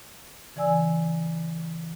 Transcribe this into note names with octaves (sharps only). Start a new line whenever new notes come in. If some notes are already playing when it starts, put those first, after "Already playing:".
C#3 E3 D5 G#5 E6